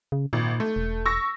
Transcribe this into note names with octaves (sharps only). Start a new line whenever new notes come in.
C#3
G#1 A#2
A3
E1
C#6 E6 A#6